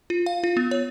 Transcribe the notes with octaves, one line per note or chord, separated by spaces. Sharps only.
F4
F5
F4
B3
C#5